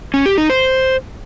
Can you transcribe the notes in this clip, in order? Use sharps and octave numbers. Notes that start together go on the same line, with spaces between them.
C#4
G4
D#4
C5